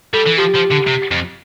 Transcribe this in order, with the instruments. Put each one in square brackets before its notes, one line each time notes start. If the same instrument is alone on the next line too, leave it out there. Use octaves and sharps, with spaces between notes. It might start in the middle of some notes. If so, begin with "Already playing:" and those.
[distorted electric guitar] G3 [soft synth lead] A4
[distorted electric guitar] E3
[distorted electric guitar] F3 [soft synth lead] G4
[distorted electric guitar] F3
D3
C3
F2